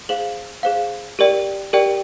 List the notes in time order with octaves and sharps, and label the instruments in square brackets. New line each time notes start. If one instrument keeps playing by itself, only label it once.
[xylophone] G#4 C5 F5 F#7
G#4 C5 F5
G4 A#4 D5 G5
G4 A#4 D5 G5